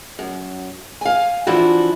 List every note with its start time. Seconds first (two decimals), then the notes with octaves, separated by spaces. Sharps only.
0.19 F#2
1.01 F5 G#5
1.47 E3 F3 D4 E4 F#4